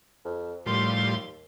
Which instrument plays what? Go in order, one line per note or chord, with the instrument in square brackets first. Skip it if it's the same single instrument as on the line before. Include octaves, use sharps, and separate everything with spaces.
[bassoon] F2
[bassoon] D#2 [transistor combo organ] A2 F3 G3 [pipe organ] F5 C6